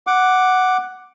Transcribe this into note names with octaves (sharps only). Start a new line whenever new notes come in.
F#5 D6